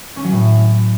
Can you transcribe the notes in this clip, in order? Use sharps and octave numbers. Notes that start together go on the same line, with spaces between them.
C#4
F#3
A2